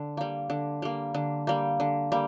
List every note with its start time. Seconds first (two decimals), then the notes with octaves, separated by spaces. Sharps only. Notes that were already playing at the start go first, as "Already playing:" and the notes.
Already playing: D3
0.17 G3 A#3
0.50 D3
0.82 G3 A#3
1.14 D3
1.47 G3 A#3
1.80 D3
2.12 G3 A#3